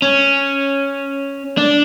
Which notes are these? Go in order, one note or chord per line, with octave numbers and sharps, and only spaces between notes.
C#4
D4